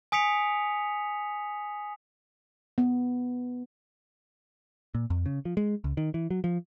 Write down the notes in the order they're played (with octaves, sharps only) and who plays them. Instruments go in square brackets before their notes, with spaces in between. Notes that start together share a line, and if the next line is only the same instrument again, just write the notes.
[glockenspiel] G#5 D#6 B6 C#7 F7
[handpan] B3
[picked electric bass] A#2
F2
C#3
F3
G#3
C#2
D#3
E3
F#3
F3